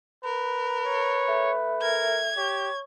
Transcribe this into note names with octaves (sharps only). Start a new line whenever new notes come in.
A#4 B4
C#5
A3
A#4 G#6
G4 C#5